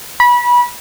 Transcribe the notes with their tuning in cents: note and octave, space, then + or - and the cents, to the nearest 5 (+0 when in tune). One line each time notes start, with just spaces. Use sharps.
B5 -25